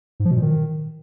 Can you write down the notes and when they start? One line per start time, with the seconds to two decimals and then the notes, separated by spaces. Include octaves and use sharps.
0.20 G#2
0.25 F3
0.31 B2
0.36 A#2
0.42 D#3